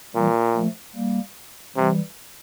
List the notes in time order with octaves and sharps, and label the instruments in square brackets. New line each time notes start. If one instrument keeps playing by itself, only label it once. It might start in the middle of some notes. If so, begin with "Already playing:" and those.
[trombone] A#2 [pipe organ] E3 G3
[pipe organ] F3 A3
G3 A#3
[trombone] C3 [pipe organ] E3 G3